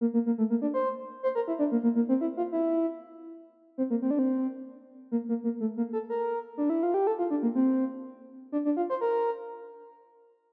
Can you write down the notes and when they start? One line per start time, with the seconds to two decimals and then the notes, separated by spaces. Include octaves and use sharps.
0.01 A#3
0.14 A#3
0.26 A#3
0.38 A3
0.50 A#3
0.62 D4
0.74 C5
1.23 C5
1.35 A#4
1.48 E4
1.59 D4
1.72 A#3
1.83 A#3
1.95 A#3
2.09 C4
2.21 E4
2.37 F4
2.52 E4
3.78 C4
3.90 A#3
4.02 C4
4.11 D4
4.19 C4
5.12 A#3
5.29 A#3
5.44 A#3
5.60 A3
5.77 A#3
5.93 A4
6.10 A#4
6.57 D4
6.70 E4
6.83 F4
6.94 G4
7.07 A4
7.19 F4
7.30 D4
7.43 A#3
7.55 C4
8.52 D4
8.65 D4
8.77 F4
8.90 C5
9.01 A#4